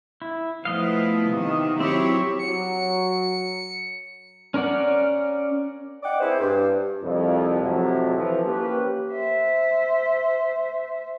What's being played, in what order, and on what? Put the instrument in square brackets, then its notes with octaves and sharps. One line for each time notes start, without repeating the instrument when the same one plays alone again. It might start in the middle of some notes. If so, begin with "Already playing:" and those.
[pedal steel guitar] E4
[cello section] F3 A3 E4 [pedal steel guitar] B3 D#5 F5
[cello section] C3 D#3
[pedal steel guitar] F#3 C4 [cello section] E4 G4 C#5
[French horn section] F#3 [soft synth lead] C#7
[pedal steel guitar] C#4 A#4 D5 F#5
[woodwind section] D5 D#5 F#5 G5 D6
B3 C4 E4 G#4 C5
G2
[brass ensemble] C2 F2
F2 A2 C3 F#3
E3 F3
A#3 C#4 G4 B4
[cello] C5 E5